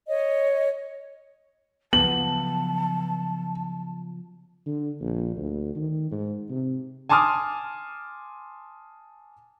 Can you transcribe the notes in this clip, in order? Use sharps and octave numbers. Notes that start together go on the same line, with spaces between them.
C#5 D#5
C#3 F3 F#3 B3 A5 F#7
D3
A#1
D2
D#3
G#2
C3
G#5 A5 C6 D6 D#6 F6